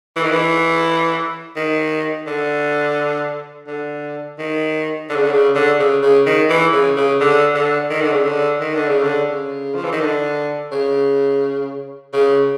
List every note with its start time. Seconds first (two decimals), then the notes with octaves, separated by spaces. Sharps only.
0.16 E3
0.23 D#3
0.31 E3
1.56 D#3
2.27 D3
3.67 D3
4.38 D#3
5.09 D3
5.16 C#3
5.23 D3
5.32 C#3
5.55 D3
5.79 C#3
6.02 C#3
6.26 D#3
6.49 E3
6.72 C#3
6.97 C#3
7.20 D3
7.54 D3
7.90 D#3
8.01 D3
8.13 C#3
8.23 D3
8.60 D#3
8.74 D3
8.88 C#3
9.03 D3
9.30 C#3
9.74 F3
9.84 E3
9.92 D#3
10.01 D3
10.72 C#3
12.13 C#3